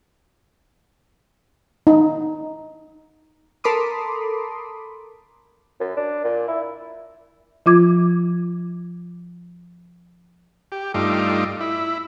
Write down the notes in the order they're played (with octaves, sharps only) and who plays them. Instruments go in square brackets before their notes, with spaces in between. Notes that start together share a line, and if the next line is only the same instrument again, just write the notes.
[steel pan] D#4
[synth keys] A4 A#4 B5 C6 D6 D#6
[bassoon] F#2
D4
A#2
E4
[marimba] F3 F4 D6 G#6
[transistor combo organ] G4
G2 A3 D#4 F4 D6
E4